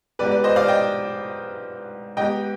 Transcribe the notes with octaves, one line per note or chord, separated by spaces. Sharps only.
G#2 G3 B3 B4 D5
B4 D5
C5 D#5
D5 F5
D#5 G5
G#2 G3 B3 D#5 G5